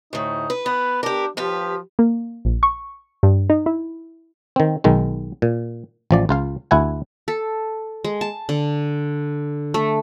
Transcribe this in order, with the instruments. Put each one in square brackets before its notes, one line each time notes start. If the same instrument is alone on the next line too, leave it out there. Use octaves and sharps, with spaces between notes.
[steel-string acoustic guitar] D2 A2 [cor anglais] D#4
[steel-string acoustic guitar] B4
[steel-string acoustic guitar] B3 [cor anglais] B4
[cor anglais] D4 [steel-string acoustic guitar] G4 A#4
[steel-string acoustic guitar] D#2 G4 B4 [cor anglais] F3
[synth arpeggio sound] A#3
A#1
C#6
G2
D#4
E4
[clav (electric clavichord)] D#3 C4
B1 D#3 G#3
A#2
A1 F3 D5
C#2 F4 F5
D2 E4 F#5 G#5
[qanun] A4
G#3
A5
D3
A3